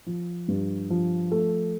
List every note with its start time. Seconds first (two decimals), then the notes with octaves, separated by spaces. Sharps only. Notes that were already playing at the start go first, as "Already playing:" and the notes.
0.07 F3
0.48 G2
0.90 F3
1.32 A3